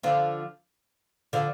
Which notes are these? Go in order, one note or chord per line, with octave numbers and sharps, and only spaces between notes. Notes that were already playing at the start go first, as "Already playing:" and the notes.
D3 F3
D3 F3